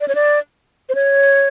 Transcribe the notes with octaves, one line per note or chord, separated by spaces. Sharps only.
D5
C#5
D5
C5
C#5